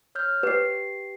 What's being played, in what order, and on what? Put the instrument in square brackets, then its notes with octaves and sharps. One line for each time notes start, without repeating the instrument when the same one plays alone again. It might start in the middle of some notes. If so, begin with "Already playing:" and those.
[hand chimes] C#5 F6 G6
[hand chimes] G4 C7 [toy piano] B4